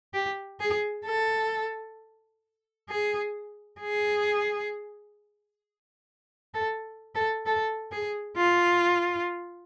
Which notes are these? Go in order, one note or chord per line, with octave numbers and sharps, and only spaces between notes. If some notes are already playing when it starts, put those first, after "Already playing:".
G4
G#4
A4
G#4
G#4
A4
A4
A4
G#4
F4